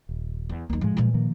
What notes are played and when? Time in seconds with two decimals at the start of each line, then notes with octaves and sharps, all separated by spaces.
0.09 D#1
0.49 E2
0.70 D#2 F#3 A#3 D#4
0.81 A2 F3 G#3
0.97 A#2 E3
1.14 D#3 F3 A#3